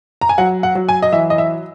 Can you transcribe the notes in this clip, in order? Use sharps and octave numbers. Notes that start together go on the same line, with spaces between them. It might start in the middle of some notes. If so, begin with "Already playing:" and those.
A#5
G#5
F#3 F#5
F#5
F#3
G#5
D#5
E3 E5
D#5
E5